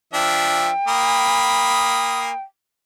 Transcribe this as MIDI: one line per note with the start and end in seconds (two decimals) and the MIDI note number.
0.14 0.69 53
0.14 0.69 62
0.14 0.69 76
0.14 2.40 79
0.88 2.31 58
0.88 2.31 83
0.88 2.31 87